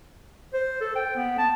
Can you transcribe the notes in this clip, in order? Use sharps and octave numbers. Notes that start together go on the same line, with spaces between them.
C5
A4
G5
B3
A5